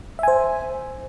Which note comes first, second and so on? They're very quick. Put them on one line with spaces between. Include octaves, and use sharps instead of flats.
E5 G#5 C5